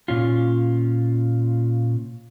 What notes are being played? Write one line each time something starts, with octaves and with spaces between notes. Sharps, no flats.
A#2 C#4 F4